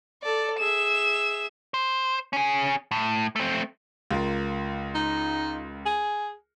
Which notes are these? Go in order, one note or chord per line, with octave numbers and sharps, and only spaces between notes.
A4 D5
G#4 E5 E7
C5
C#4 G#4
A2
A3 C4
C#2 F4 A#4
D#4
G#4